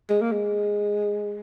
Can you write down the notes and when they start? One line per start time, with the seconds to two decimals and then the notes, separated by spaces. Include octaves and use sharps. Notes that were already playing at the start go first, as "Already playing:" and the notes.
0.10 G#3
0.22 A#3
0.32 G#3